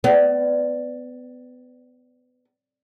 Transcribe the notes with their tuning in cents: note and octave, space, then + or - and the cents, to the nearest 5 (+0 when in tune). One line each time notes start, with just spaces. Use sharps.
B3 +30 D5 +0